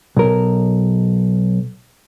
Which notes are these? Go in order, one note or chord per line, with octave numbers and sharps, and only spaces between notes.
B1 A#4